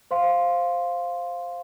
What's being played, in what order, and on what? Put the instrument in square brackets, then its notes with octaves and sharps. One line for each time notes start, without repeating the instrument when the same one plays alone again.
[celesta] C5 F5 C6